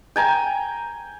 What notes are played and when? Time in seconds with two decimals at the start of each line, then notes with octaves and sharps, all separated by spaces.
0.16 G5 G#5 A#5